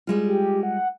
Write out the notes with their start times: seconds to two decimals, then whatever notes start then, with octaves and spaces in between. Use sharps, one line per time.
0.07 G3 G#3 F4
0.26 G4
0.63 F#5